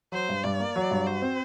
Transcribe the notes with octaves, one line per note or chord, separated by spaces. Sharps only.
F#3 C5
G2
G2 D5
A#3
F#3
G2
F#4 C5
C4